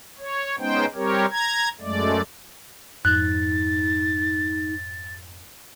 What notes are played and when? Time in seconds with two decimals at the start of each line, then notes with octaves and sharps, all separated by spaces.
0.19 C#5
0.59 G#3 B3 C#4 D#4 C5 G5
0.95 G3 C4 G4 A#4 C#5
1.31 A#5 G#6
1.81 F#2 G#3 A3 D5
3.05 F2 G#2 D#4 F#6 A6